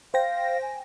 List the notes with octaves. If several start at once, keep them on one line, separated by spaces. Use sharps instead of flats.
C5 F5 G5 A#6
G#5